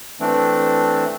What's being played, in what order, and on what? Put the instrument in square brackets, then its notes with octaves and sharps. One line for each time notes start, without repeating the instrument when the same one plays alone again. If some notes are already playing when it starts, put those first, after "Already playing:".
[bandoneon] E3 A3 C4 D4